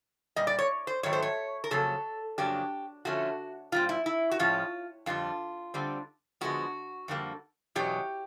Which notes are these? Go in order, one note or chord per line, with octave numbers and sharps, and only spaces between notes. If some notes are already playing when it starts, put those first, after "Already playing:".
A#2 G3 D#5
D5
C#5
C5
G#2 D#3 F#3 A3 C#5
C5
C#5
A#4
F2 C#3 F#3 A#3 A4
F2 C#3 F#3 A#3 D4 G4
D3 F3 A3 C#4 F#4
A#2 G3 C4 F4
E4
E4
F#4
A2 F3 G#3 C#4 F4
F2 D3 G3 F4
D3 G3 C4
D3 F3 G#3 B3 F#4
F2 D3 G3 A#3
E2 B2 F#3 C#4 G4